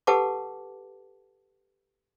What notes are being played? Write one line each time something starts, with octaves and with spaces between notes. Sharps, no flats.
G4 A4 B4 F#5 A5 D6